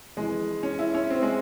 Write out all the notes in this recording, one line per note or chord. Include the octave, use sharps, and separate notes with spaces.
F2 E3 G#3
C#4
E4
C#4
C4
G#3